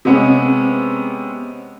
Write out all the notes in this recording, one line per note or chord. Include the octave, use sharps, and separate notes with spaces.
C3 G#3 B3 C#4